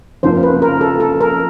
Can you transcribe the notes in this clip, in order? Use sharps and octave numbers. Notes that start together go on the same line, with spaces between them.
F#1 F2 C#3 F3 A#3 C5
B4
A#4
A4
A4
A#4